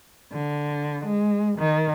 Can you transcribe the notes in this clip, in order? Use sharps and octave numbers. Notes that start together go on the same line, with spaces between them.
D3
G#3
D#3